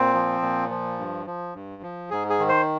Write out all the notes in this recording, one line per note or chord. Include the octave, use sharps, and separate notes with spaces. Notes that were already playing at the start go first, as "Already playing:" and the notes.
Already playing: A#2 C4
F3
A#2
F3
G2
F3
G2
F3
G#2 G#4
G#4
D#3
C5